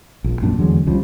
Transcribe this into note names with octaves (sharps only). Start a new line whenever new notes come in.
A#1
F#2 A#2 D4
E2 D3 F#3 G#3
C#2 C#3 F3 G3